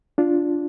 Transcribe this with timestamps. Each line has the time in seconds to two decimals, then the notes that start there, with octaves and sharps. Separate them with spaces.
0.18 D4 F4